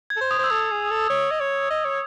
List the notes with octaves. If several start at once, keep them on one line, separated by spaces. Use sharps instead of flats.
G#6
A4
C5
D#6
C5 E6
A4 D#6
G#4
A4
C#5
D#5
C#5
D#5
C#5